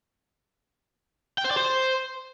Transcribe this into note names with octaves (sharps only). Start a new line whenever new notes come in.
G5
C5
D5
C5